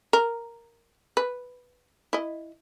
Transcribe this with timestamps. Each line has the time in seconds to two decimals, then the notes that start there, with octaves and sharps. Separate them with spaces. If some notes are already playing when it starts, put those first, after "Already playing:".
0.13 A#4
1.17 B4
2.13 E4 D#5